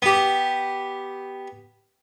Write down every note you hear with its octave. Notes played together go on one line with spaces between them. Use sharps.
B3 G4